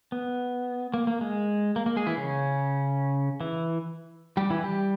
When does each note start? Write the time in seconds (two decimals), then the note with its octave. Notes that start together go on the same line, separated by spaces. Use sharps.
0.12 B3
0.94 A#3
1.07 A#3
1.21 G#3
1.76 A#3
1.86 A#3
1.96 G#3 G#4
2.07 E3 E4
2.17 C#3 C#4
3.40 E3 E4
4.37 G3 G4
4.50 E3 E4
4.64 G3 G4